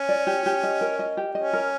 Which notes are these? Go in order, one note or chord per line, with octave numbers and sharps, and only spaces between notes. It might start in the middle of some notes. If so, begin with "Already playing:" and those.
Already playing: C#4
D5
G4
G4
D#5
A#4
D#5
G4
C#4 D#5
A#4